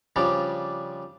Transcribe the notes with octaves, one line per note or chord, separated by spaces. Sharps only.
C#3 F3 G3 D4